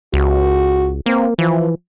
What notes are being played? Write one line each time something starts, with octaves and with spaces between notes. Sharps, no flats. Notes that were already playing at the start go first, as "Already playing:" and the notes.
C#2 F#4
A#3 C4
E3 F3